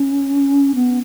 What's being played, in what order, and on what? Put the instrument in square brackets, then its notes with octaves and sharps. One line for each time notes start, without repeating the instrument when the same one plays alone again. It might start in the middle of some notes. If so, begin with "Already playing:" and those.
Already playing: [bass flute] C#4
B3